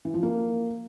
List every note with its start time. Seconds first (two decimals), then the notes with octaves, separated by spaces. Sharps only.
0.05 E3
0.14 F3
0.23 A#3